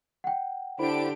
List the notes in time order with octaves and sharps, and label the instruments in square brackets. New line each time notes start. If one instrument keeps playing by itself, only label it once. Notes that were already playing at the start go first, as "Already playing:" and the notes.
[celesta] F#5 G5
[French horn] D3 [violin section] D4 G4 D7 [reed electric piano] E4 C5 B5